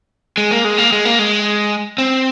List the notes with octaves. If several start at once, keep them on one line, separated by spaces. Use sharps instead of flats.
G#3
A#3
G#3
A#3
G#3
A#3
G#3
C4